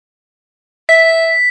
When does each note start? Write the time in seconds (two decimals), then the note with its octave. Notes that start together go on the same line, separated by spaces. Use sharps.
0.89 E5 B6